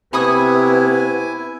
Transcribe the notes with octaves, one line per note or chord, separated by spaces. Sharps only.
C3 B3 E4 G#5 B5 C#6 D#6